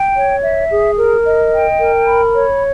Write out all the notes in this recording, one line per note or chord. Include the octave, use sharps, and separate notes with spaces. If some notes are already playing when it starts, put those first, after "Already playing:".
Already playing: G5
C#5
E5
G#4
A#4
D#5
G5
A#4
B5
C#5